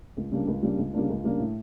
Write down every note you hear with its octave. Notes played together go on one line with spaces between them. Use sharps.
C#2
C#3 G3 A#3 D4
C#2
C#3 G3 A#3 D4
C#2
C#3 G3 A#3 D4
C#2
C#3 G3 A#3 D4
A2